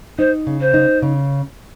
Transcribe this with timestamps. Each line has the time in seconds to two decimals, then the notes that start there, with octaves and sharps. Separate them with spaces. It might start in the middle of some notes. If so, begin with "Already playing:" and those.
0.19 D#4 C5
0.47 C#3
0.61 C5
0.74 D#4
1.02 C#3